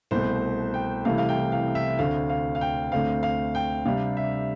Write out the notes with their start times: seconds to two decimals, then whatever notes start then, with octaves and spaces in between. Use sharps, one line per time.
0.11 C2 B2 A3 C5
0.74 G5
1.05 C2 C3 E3 A3 F5
1.18 F5
1.29 G5
1.52 F5
1.75 E5
1.99 D2 D3 A3 C4 F5
2.29 F5
2.55 F5
2.61 G5
2.92 D2 D3 A3 C4 F5
3.23 F5
3.55 G5
3.85 C3 G3 D4 F5
4.17 E5